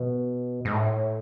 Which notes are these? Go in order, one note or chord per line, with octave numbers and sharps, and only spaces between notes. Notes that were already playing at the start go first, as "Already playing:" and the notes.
Already playing: B2
G#2
A2